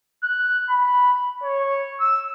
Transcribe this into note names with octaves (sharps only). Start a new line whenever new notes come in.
F#6
B5
C#5
E6